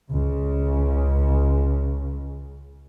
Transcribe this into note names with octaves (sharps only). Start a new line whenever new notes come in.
C#2 C#3